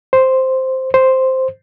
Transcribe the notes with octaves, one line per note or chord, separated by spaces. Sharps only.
C5
C5